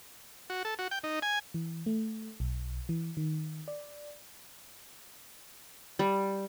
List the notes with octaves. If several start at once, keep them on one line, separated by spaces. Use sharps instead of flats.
F#4
A4
F#4
G5
D#4
G#5
E3
A3
B1
E3
D#3
D5
G3